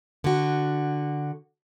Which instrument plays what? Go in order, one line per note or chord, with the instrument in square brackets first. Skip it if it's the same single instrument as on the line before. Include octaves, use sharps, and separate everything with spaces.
[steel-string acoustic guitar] D3 F#4